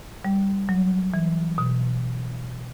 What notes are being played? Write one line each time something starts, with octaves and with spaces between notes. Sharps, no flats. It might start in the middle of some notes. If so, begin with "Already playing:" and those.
G3
F#3
E3
B2